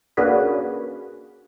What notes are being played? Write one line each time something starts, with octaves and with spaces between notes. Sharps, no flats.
A#3 C#4 D4 F#4 G#4 B4